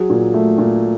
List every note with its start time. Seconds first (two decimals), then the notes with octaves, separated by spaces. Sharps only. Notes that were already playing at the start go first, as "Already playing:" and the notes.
Already playing: F#3 G#4
0.10 A#2
0.34 A3
0.58 A#2